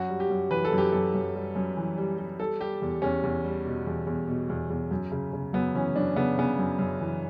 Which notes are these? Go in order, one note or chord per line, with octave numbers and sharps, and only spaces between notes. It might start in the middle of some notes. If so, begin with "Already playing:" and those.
Already playing: F#2 F#4
G3
G4
F#2
E3 B4
A4
F#2
G4
F#2 A4
F#2
G3
F#2
E3
G3
G3
G3 A4
G3 G4
E2
E2 C#4
E2
G3
B2
E2
E2
B2
E2
E2
F#2
C#3
C#3
F#2 B3
E3 C#4
F#2 D4
C#3 B3
C#3 B3
F#2
F#2
E3